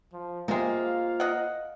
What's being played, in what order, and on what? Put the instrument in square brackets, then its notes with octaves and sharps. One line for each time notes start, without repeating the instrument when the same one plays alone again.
[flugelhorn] F3
[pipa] C3 G#3 [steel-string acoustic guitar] A#3 F4 C5 [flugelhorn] F5
[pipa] D#5 F#5